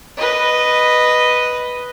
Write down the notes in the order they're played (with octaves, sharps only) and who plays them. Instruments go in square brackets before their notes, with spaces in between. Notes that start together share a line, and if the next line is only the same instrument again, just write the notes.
[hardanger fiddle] B4 D#5